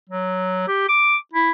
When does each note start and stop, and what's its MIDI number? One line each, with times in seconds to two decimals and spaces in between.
0.09 0.66 54
0.68 0.85 67
0.89 1.16 86
1.33 1.52 64